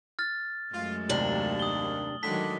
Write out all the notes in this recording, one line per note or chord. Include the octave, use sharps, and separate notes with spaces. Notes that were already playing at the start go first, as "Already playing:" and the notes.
F6 A6
F#2 G#3 A3 F4
D#2 C3 D4 F#7
D#6 G7
A2 D3 D#3 F#3 G#3 D4 B6